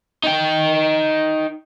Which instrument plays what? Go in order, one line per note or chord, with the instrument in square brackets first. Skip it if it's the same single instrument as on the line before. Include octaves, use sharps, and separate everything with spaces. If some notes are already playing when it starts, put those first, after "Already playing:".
[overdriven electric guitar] D#4 G5